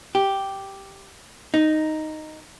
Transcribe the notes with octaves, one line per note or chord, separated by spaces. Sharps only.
G4
D#4